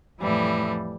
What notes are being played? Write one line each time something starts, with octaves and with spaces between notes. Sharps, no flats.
F2 A2 E3 G3